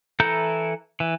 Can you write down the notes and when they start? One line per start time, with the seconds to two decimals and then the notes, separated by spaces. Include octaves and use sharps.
0.20 E3 E4 A4 A#5 G6
1.00 E3